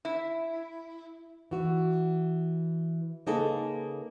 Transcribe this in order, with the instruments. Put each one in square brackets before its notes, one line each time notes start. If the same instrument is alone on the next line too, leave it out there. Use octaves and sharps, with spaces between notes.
[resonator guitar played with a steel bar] E4
[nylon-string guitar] E3 F#4
C#3 A#3 D#4 G#4 A4 B4